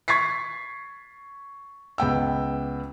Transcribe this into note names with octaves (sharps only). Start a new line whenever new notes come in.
C#6 G#6 A6 B6 C7
C#2 B3 G5 E6